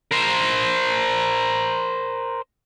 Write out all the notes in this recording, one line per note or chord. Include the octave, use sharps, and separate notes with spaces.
A#4 C5